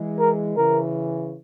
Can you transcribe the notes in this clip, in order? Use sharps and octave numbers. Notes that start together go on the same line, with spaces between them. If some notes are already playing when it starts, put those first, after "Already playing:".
Already playing: E3 G#3
A#4
C#3 E3 A#4